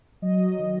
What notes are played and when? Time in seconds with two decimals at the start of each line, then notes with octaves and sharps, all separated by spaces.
0.22 F#3 D#5
0.59 D#3